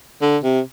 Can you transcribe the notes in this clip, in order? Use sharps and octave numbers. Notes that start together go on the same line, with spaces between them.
D3
C3